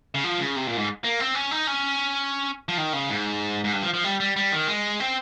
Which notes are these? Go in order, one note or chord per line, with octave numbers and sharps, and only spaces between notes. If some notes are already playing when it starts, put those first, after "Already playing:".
C#3
F3
C#3
C3
A#2
G#2
A#3
C4
C#4
D#4
C#4
F3
D#3
C#3
G#2
G#2
G2
F3
F3
G3
G3
G3
D#3
G#3
C4